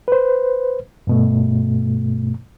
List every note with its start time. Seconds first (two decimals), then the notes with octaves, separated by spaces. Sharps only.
0.08 B4 C5
1.07 G2 B2 A3